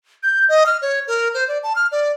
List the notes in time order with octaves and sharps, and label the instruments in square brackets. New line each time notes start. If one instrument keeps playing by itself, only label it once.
[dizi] G6
D#5
F6
C#5
A#4
C5
D5
A5
F6
D5